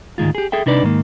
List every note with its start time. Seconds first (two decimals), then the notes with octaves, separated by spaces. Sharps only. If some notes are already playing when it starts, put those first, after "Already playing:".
0.18 D2 G#2 D#3 G#3 F4
0.35 G4 G#4
0.52 G#4 A4 E5 G5
0.66 C3 D4 D#4 B4 D5
0.83 G#2 D#3 A#3